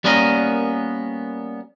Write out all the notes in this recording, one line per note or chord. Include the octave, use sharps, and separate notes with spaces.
G3 A#3 B3 C#4 A#4 D#5